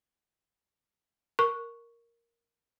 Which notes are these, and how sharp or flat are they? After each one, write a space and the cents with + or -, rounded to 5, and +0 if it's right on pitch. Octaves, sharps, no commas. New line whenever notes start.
A#4 +0 C#6 +5